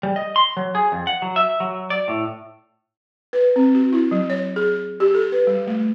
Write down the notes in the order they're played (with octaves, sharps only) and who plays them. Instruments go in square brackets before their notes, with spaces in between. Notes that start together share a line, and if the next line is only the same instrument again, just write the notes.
[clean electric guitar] G3
D#5
C6
F#3
G#4
F2
F#5
F#3
E5
F#3
D5
A2
[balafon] B4
C4
F#4
E4
F#3
C#5
G#4
G4
A4
B4
G3
A3